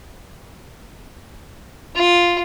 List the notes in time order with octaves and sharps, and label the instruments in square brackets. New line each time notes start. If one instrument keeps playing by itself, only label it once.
[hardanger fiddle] F4